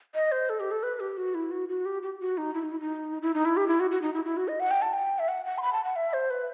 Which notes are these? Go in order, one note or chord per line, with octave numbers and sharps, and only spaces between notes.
D#5
C5
A4
G4
A4
B4
G4
F#4
E4
F#4
F#4
G4
G4
F#4
D#4
E4
D#4
E4
D#4
E4
D#4
E4
G4
E4
F#4
F#4
D#4
E4
E4
F#4
D#5
F#5
G5
A5
G5
E5
F#5
F#5
C6
B5
A5
F#5
E5
C5
B4